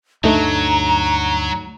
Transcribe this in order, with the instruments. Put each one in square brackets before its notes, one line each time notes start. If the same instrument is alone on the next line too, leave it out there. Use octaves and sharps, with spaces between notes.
[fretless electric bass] D2 G2 D4 [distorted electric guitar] F#3 [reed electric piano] A3 D#4 [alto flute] A#5